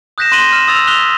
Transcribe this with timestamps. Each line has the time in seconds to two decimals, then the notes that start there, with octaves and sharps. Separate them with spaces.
0.18 D#6 F#6 G6 A#6 B6 E7
0.32 C6 F#6 A#6 D#7 F#7 G7
0.52 F6 E7
0.68 D#6 E6 A6 F7
0.87 D#6 F6 F#6 B6 F7 G7